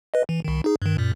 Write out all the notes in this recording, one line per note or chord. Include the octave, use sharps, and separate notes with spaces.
B4 D#5
E3
C2 D#3
D#4 G#4
G2 D#3
F#2 A#2